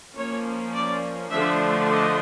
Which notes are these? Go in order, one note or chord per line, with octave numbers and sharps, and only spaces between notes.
F3 A#3 C#4 C#5
D5
D3 F3 A3 D4 E5
D#5